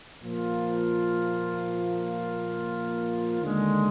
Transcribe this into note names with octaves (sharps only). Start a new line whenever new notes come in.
A#2 F3 A#3 F4
D#2 D3 G#3